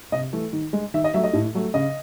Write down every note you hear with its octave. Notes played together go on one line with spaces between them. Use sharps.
C3 D#5
E3 A3
D#3
G#3
D#3 E5
D#5
F#3 A3 E5
D#5
A2
F#3 A3
C#3 D#5